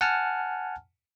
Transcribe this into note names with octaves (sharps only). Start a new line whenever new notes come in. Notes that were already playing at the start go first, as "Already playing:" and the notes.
F#5 G#5 A5 F6